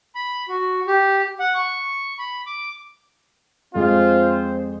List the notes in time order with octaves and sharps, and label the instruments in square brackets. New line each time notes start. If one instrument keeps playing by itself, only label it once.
[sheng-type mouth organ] B5
F#4
G4
F#5
C#6
B5
D6
[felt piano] F2 G#3 [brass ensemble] C4 C5 [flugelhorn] F4